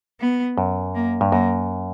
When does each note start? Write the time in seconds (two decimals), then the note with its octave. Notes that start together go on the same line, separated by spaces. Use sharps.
0.21 B3
0.58 F#2
0.95 A#3
1.21 G2
1.32 F#2 A#3